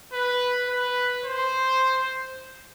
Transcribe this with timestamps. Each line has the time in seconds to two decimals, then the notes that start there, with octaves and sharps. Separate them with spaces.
0.13 B4
0.69 B4
1.25 C5